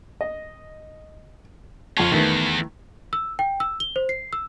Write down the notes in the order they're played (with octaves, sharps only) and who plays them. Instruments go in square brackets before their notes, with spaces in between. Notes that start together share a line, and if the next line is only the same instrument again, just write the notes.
[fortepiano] D#5
[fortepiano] F2 A5 [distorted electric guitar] F4 C#5
[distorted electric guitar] E2 [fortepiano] D#3 A3 B3
[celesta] E6
G5
E6
G7
C5
C7
E6